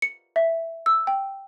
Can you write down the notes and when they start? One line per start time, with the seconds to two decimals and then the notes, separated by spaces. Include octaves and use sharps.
0.02 C#7
0.36 E5
0.86 E6
1.07 G5